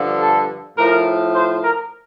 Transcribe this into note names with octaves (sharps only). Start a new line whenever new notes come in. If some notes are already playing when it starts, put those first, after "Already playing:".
Already playing: G2 D3 F3
A4
A2 F3 A#4
C5
A#4